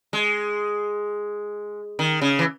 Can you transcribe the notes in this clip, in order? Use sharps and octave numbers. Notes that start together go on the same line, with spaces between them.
G#3
D#3
C#3
E3